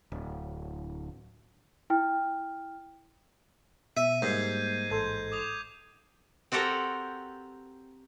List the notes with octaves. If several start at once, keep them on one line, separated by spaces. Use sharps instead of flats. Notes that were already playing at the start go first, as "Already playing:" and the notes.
D1
E4 G5 F6
B2 E5 D#7
G#2 G3 A#3 G6 G#6 C7
A1 A4 C6 G#6
D6 D#6 F7
C4 F#4 G4 A4 A#4